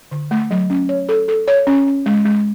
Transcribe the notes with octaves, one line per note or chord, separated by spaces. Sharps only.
D3
A3
F#3
C#4
C#5
A4
A4
C#5
C#4
C#4
G#3
G#3